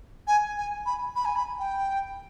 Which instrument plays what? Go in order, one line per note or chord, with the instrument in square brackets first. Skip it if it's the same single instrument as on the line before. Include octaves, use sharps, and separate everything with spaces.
[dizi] G#5
G#5
B5
B5
G#5
B5
G5